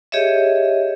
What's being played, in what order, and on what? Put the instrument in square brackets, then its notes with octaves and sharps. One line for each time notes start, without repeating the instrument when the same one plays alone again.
[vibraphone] G4 G#4 C#5 D#5 E5